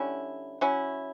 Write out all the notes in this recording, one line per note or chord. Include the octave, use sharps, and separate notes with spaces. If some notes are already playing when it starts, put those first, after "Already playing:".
Already playing: D3 G3 C#4 E4
F#3 C#4 E4